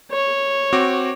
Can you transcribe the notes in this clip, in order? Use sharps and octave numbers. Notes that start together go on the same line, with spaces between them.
C#5
C4 F#4 D6